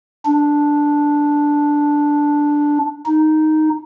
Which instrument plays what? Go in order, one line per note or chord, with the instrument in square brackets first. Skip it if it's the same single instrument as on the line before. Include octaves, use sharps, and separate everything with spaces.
[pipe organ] D4
D#4